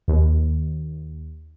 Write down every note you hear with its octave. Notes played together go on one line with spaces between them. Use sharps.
D#2